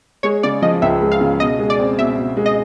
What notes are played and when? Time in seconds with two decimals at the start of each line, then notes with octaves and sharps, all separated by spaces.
0.23 G#3 C#5
0.43 C#3 D5
0.62 F3 D#5
0.82 C#2 E5
1.02 G#3
1.12 F5
1.21 C#3
1.40 B2 D#5
1.59 G#3
1.70 D5
1.79 C4
1.99 B2 E5
2.17 B2
2.37 G#3
2.46 D#5